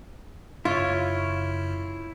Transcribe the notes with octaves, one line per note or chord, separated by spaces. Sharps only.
F#2 C#3 E4 F4 C#5